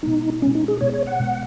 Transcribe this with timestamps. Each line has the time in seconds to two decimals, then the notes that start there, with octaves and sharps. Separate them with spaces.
0.03 B2 G#3 B3 D#4
0.42 B2 G#3 B3 C#4
0.55 D#4
0.68 G#4
0.81 B2 G#3 B3 C#5
0.94 C#5
1.07 F#5
1.20 B2 G#3 B3